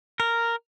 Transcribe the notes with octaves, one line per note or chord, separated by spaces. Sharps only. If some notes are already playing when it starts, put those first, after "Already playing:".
A#4